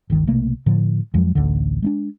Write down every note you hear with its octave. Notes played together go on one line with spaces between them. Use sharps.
G1 C#2 D#3
B1 C3 A3 A#3
A2 D3 F3
F2 F3 F#3 G#3
A1 D2 D3
G#3 A#3 D4